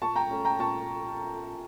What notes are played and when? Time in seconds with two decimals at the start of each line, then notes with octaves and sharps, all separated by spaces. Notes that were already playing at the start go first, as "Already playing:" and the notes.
0.02 A#2 A5 C#6
0.16 G5 A#5
0.30 A3 C#4
0.45 G5 A#5
0.59 A#2 A5 C#6